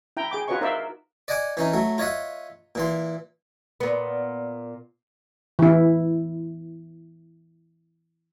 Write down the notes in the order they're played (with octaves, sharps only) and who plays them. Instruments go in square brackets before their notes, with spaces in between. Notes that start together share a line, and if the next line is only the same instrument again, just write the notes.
[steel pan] E4 G5 A#5
G#4 G5 D6
F4 F#4 B4 C#5 D#5 C#6
D#4 A#4 C5 D5 E5 F5
[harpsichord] D5 D#5 F#5 G#5 D6
E3 C#4 D#4
F#3 A3
F4 C#5 D#5 E5 F#5
A#2 E3 C6
[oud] A#2 B3
[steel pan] E3 E4